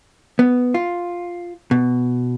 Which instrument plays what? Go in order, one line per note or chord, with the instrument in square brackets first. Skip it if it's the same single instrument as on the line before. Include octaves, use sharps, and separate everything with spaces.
[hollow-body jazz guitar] B3
F4
B2